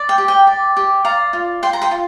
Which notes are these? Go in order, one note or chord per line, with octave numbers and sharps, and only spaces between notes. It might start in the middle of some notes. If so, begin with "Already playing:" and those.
Already playing: D5
G5
G4
G5
D5
G4
D5 F5 A#5
F4
F4 G5 C6
A#5
G5 C6
F4